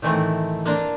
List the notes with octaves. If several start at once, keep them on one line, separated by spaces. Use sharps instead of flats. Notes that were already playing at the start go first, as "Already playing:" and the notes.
A2 D#3 E3 A3 C4
A#3 C4 D4 F4 A#4